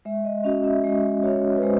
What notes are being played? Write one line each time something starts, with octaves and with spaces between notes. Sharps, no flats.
G#3 E5
D#5
C#4 F#4 D#5
E5
G#3 D#5
C#4 F#4 C#5
B4
G#3 C5